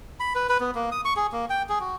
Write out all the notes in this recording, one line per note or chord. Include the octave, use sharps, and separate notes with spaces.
B5
B4
B4
B3
A#3
D#6
C#6
G#4
A#3
G5
G#4
F#4